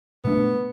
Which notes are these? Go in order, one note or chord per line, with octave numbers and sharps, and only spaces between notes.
B2 A3 B3 D4